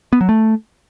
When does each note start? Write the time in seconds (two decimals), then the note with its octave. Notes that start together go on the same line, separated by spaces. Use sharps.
0.13 B3
0.21 F#3
0.29 A3